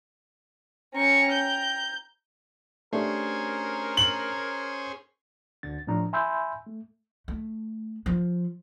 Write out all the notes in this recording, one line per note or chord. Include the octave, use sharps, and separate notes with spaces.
C#4 G5 A#5 C#6
G6
A3 C#4 D4 G4 G#4 A#4 C5
F#7
D2 D3 A6
A2 F3 D4 A#5
E5 G#5 B5 C6 E6 G6
A3
A3
F3